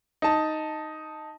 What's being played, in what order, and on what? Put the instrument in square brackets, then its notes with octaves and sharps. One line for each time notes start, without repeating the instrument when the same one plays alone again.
[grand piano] D#4 A5